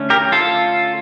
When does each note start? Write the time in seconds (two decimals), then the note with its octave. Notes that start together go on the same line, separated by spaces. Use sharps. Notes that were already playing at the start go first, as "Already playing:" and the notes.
Already playing: D3 A3 C#4
0.10 G4 A#4
0.32 F4 A4